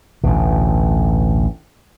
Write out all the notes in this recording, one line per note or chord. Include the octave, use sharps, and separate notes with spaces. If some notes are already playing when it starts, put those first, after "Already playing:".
A1 D2 B2